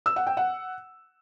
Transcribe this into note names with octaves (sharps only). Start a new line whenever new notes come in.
E6
F#5
G5
F#5